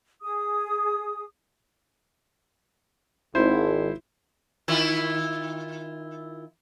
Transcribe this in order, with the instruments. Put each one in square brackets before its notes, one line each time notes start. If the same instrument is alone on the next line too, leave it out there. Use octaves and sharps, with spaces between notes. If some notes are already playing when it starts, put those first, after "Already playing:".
[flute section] G#4 D#6
[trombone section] G#1 [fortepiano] E4 C5
[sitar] D#3 E4 F4